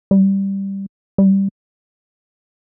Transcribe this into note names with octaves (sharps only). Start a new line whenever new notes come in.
G3
G3